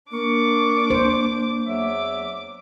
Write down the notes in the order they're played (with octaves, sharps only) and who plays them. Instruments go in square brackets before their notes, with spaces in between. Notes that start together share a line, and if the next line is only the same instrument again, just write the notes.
[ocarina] A#3 [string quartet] D4 D6 [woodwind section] A#4 C#6
[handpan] C5
[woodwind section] E2 F#3 E5 [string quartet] D6